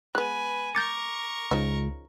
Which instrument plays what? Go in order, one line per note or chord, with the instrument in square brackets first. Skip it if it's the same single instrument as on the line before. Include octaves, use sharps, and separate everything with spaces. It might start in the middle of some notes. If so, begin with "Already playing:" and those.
[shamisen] G#3 B3 [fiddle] B4 G#5 [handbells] F#6
[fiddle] A#4 C#6 [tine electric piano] D6 [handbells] G6 A6 C#7
[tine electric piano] C#2 [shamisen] C#3 F3 D#4